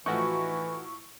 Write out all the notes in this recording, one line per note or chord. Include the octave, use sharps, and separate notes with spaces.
A2 E3 F3 A3 D#4 F#4 C#6